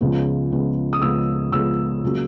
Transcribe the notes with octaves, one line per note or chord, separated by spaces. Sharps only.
C#2 C#3 F3 G#3 B3
C#2 C#3 F3 G#3 B3
D#6
C#2 C#3 F3 G#3 B3 E6
C#2 C#3 F3 G#3 B3 E6
C#3 F#3 A#3